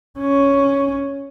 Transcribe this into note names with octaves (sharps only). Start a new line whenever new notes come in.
C#4